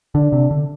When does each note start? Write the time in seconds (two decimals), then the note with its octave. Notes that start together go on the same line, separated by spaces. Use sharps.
0.15 D3 D4
0.32 C3
0.51 D3